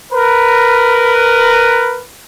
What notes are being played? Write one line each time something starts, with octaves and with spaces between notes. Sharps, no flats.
A#4 B4